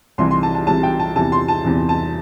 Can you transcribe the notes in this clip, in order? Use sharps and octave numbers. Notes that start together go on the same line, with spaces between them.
C2 C3 E3 C6
C6
A5
A5
C2 C3 E3 A5
G5
A5
E2 C3 E3 A5
C6
A5
E2 C3 E3
A5